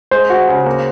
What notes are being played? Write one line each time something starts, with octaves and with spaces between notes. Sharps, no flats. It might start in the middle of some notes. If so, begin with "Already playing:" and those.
G#3 C5
F#4
C#3
A#3